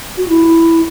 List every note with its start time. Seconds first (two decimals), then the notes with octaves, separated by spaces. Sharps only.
0.17 F#4
0.28 E4